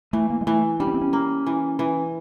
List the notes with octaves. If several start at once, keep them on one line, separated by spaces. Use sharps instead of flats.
E3 A3
A#3
G#3
E3 A3
G3 D4
C#4
C4
C#4
A#3
E3
E3